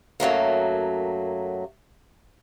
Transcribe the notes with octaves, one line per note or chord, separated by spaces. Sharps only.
F#2 F#3 A3 A#3